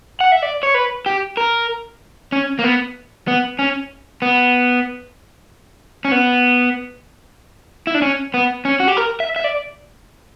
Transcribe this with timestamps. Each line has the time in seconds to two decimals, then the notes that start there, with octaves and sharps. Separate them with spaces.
0.20 F#5
0.32 E5
0.42 D5
0.63 C#5
0.74 B4
1.06 G4
1.37 A#4
2.32 C#4
2.59 A#3
2.64 B3
3.28 B3
3.59 C#4
4.22 B3
6.05 C#4
6.12 B3
7.87 E4
7.94 D4
8.02 C#4
8.34 B3
8.65 C#4
8.80 F#4
8.88 G4
8.97 A#4
9.20 E5
9.36 E5
9.44 D5